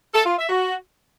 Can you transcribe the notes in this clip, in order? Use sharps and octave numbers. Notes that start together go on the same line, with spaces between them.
A4
F4
E5
F#4